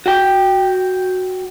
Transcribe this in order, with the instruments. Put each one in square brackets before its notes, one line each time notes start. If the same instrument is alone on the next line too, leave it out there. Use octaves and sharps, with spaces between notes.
[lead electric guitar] F#4 G5